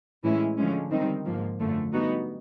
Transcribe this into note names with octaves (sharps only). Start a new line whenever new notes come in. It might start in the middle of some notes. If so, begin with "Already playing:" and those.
A2 E3 G#3 C#4 E4
D3 F3 G#3 C#4
D#3 G3 C4 D#4
G#2 F3 A#3
F#2 D3 F3 A3
G3 B3 D#4 F#4